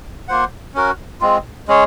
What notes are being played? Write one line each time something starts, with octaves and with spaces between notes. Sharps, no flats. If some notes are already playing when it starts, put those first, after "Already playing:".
A#3 F4 C5 F#5
C#4 F#4 A#4
G#3 C4 F4
G#3 C#4 G#4 C#5